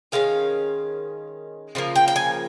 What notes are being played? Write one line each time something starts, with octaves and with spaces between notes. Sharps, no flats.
D#3 G#3 C#4 F5
C#3 F3 A#3
G5
G5
G#5